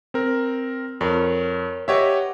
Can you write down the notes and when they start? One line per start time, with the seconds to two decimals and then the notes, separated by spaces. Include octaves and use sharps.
0.14 C4 A#4
1.01 F2 A#4 C#5
1.88 G4 B4 C#5 D#5 E5 F#5